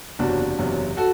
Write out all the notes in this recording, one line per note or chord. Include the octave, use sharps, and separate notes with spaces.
F#1 E2 C3 F#3 D4 F#4
F#1 E2 C3 F#3
F#4 A4